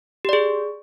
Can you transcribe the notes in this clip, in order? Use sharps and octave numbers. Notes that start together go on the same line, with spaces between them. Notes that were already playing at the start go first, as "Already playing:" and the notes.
G4 G#4 D5